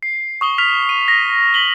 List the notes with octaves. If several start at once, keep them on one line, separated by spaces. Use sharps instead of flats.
C7
C#6 D#6 G7
F6 B6 F7
D#7
A#6
B6 F#7 G7